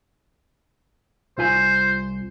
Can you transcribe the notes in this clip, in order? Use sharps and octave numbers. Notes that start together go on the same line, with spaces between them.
C2 F4 C5 G#5